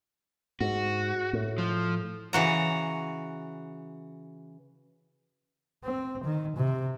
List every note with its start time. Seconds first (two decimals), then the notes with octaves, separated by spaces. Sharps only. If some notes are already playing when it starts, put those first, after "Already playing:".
0.61 G#2 F#4
1.33 A2
1.58 F3
2.33 C#3 E3 F#4 A#5
5.84 C4
6.24 D#3
6.57 C3